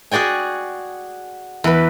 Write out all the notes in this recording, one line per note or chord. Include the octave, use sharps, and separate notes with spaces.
F#4 G#4 D5 G5 G#5
E2 B4